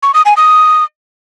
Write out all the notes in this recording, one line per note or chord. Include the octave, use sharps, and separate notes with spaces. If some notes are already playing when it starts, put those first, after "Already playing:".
C#6
D#6
G#5
D#6